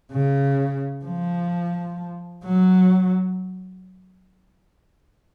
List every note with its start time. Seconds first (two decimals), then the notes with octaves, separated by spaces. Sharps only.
0.12 C#3
1.05 F3
2.45 F#3